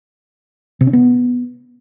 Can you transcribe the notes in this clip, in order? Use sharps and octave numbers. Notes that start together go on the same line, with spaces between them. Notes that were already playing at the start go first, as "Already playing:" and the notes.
C3
C#4
B3